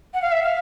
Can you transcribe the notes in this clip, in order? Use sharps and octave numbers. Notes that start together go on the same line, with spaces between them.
F#5
F5
E5
F5